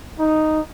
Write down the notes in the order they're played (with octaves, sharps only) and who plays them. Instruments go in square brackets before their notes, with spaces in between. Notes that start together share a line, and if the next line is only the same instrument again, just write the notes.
[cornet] D#4